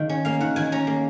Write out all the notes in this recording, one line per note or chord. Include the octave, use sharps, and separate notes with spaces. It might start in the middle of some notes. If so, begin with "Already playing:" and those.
Already playing: D#3 A#3
C#4
A#3 F5
D#3 F#5
D#3 G#5
C#4 A#5
A#3